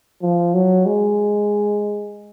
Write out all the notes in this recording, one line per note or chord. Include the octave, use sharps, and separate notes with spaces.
F3
F#3
G#3